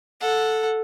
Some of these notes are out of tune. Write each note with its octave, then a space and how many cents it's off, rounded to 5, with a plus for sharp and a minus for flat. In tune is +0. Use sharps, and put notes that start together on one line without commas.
A4 +0 F#5 -15